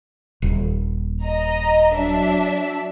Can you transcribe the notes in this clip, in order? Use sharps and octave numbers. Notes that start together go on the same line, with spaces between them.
D#1
D#5 A#5
F#3 D4 E5